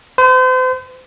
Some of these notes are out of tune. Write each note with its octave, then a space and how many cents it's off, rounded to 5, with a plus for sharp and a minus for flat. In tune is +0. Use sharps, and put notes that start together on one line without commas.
C5 -40